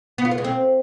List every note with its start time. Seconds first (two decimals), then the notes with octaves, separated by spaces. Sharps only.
0.18 B3
0.25 F4
0.31 B3
0.38 G#3
0.44 C4